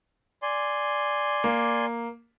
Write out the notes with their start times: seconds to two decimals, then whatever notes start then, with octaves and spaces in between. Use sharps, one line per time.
0.42 D5 G#5 C6
1.44 A#3